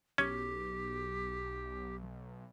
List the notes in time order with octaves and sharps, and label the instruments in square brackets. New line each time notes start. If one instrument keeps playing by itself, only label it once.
[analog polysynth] B1 [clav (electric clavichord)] C#4 [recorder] G4